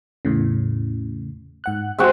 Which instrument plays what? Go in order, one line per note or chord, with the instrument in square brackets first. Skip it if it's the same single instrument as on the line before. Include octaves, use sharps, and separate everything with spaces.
[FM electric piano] E2 A2 C#3
G#2 F#5 F#6
[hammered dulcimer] G#3 C4 F#4 [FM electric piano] E5 G5